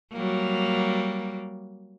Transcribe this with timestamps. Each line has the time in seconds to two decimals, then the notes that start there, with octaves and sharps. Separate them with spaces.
0.13 F#3 G3 A#3